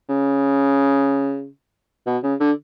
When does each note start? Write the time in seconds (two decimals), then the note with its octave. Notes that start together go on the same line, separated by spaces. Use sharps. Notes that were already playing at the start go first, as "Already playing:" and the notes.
0.09 C#3
2.07 B2
2.23 C#3
2.40 D3